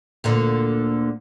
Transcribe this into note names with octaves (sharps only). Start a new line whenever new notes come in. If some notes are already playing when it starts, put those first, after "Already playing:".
D2 A#2 D3